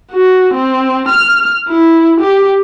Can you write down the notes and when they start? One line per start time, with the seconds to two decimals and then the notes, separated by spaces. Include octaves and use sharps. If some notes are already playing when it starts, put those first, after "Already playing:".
0.12 F#4
0.54 C4
1.08 F6
1.69 E4
2.21 G4